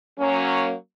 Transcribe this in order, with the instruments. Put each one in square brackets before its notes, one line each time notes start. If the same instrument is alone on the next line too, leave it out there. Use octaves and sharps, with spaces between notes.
[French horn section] F#3 A#3 C#4